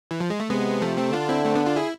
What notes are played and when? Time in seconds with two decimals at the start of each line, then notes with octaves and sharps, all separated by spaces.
0.11 E3
0.20 F3
0.30 G#3
0.40 A3
0.50 C3 G#3 B3
0.82 F3 A3
0.97 A3 C4
1.13 D3 D4 F4
1.29 C4 E4
1.45 A3 C4
1.55 B3 D4
1.66 D4 F4
1.76 E4 G#4